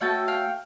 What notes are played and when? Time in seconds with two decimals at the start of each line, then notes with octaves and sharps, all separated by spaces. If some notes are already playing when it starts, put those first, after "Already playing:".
0.01 A3 C#4 F#4 A4 G5 A5
0.28 F5 G5